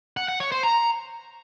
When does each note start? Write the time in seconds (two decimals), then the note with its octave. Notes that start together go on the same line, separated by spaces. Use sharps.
0.17 F#5
0.28 F#5
0.40 C#5
0.52 C5
0.63 A#5